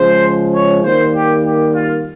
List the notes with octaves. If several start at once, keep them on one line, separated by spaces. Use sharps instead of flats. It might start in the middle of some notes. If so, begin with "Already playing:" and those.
Already playing: C#3 F3 G#3 C5
C#5
D#3 G3 A#3 C5
G4
G4
F4